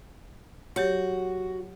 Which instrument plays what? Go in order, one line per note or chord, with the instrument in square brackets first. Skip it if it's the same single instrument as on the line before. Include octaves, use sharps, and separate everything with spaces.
[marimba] F#3 G4 C#5 [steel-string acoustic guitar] F#4